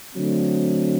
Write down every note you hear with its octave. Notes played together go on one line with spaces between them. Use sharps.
D3 F#3 A3 C4